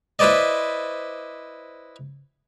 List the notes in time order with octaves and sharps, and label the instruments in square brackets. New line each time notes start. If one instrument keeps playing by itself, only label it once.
[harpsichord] E4 B4 C5 D5 D#5